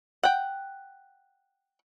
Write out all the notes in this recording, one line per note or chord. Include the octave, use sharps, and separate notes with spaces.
F#5 G5